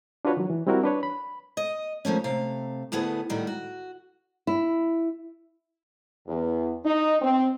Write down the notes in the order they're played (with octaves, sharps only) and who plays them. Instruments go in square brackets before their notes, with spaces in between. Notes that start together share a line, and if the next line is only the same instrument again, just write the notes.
[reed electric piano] D4 F4 F#4 B4 C#5
D#3 F#3
E3
G3 C4 E4 F#4 A#4
D4 B4 C#5
B5
[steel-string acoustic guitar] D#5
D#3 F3 A3 C#4
C3 A3 F5
D2 A2 B3 E4 G#4
A2 D#3 G3 F#4
F#4
[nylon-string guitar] E4
[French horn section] E2
D#4
C4